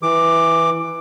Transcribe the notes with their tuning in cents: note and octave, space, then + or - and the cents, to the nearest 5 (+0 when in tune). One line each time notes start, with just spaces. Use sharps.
E3 +0 D6 +10